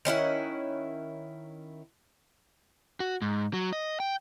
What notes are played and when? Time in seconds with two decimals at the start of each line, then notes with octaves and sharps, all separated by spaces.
0.05 D#3 C#4 E4 F#5
3.00 F#4
3.22 G#2
3.53 F#3
3.73 D#5
4.00 G5